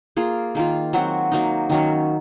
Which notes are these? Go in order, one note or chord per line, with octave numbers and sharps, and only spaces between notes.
A#3 F4 G#4
D#3 A#3 F4
F#3 C4 F#4
F#3 A#3 D#4
D#3 F#3 C#4